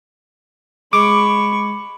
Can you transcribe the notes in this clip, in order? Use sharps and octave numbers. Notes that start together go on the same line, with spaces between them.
G#3 B5 C#6 D6